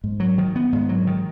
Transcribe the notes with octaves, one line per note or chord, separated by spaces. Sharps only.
G#2
F#3
D#3
B3
G#2
F#3
D#3